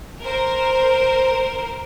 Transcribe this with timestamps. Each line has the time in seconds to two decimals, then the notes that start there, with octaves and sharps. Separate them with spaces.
0.21 A#4 C5